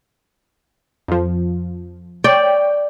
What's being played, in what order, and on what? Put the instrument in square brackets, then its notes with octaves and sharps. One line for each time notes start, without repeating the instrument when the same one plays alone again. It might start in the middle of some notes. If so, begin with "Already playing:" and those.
[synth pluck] F2 F3
[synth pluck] C#5 G5 [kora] D5